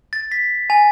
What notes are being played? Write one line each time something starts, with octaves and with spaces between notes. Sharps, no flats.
A6
B6
G#5